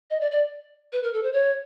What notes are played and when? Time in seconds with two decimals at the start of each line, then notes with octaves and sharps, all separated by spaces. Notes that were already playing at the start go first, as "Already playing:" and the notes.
0.10 D#5
0.21 D5
0.31 D5
0.93 B4
1.03 A#4
1.13 A4
1.23 C5
1.33 C#5